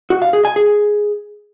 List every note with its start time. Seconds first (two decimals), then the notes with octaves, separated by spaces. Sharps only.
0.10 F#4
0.22 F5
0.33 G#4
0.45 G#5
0.56 G#4